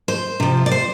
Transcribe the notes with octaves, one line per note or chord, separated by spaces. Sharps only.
C5
C3 F3
D5
C5